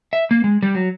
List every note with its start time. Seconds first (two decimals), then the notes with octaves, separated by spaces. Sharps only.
0.13 E5
0.31 A#3
0.44 G#3
0.62 G3
0.75 F#3